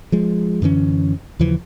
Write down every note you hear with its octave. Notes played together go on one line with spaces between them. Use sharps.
F3 G#3
F#2 D3 E3 C#4
D#2 C#3 E3 F3